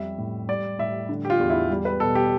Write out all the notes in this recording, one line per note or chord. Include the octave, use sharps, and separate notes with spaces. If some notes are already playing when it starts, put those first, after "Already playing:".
Already playing: F2 G3 E5
A2
G3 D5
A2 E5
D3
G4
F4
E2
E4
G3
B4
B2 A4
G4